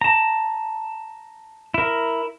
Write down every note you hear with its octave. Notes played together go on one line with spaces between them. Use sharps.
A5 A#5
E4 A#4